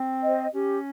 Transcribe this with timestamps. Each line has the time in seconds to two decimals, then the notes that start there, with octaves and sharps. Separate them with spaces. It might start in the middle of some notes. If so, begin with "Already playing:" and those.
Already playing: C4
0.23 C5 D#5
0.53 C#4 G4